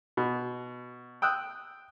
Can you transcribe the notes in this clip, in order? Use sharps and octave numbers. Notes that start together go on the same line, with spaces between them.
B2
G5 D#6 E6 F#6